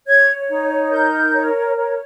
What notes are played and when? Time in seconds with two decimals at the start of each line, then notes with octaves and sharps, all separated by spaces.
0.07 C#5 G#6
0.49 D#4
0.91 A#4 G6
1.33 C#5
1.76 C#5